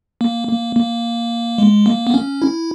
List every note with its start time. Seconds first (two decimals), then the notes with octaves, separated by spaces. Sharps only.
0.21 A#3
0.49 A#3
0.76 A#3
1.58 G#3
1.86 A#3
2.07 B3
2.14 C#4
2.42 E4